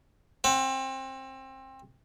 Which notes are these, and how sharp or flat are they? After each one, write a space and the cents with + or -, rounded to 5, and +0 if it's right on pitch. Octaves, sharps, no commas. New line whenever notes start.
C4 +25 F#5 +5